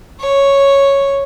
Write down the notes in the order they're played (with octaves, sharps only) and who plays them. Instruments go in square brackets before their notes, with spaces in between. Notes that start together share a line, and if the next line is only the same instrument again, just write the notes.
[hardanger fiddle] C#5